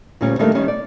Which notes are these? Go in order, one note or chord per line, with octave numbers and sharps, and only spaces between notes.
D2 A#2 G3 C#4
D#3 G3 A3 A#3 D4
D#3 G3 C#4
D5